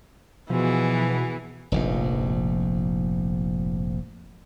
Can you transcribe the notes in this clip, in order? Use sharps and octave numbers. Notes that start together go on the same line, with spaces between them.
B2 E3 F3 B3 G#4
F1 A#1 G#2